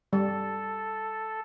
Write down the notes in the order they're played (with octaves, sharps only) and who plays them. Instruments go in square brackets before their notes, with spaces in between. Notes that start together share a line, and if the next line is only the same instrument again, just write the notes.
[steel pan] G3 [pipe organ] A4